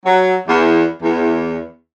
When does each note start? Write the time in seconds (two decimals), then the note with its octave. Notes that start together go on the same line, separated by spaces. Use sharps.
0.05 F#3
0.47 E2
1.02 E2